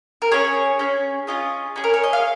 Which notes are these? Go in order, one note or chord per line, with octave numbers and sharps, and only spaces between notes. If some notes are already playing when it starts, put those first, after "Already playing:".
A#4
C#4 G#4 C#5
C#4 G#4
C#4 F4 G#4 D#5
C#4 G#4
A#4
C#5
D#5
F5